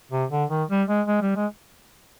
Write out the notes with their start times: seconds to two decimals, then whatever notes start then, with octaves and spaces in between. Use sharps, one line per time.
0.12 C3
0.31 D3
0.50 D#3
0.70 G3
0.88 G#3
1.08 G#3
1.22 G3
1.36 G#3